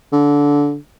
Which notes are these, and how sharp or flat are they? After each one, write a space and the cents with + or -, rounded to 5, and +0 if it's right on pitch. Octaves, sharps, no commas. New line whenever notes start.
D3 -20